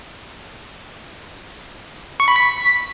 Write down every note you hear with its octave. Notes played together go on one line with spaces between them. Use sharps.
C#6
B5
B6